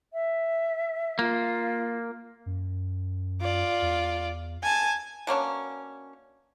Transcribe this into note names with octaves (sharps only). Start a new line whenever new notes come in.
E5
A#3 F4
F#2
F4 D5
E2
G#5 A5
B2 A#3 C#4 D4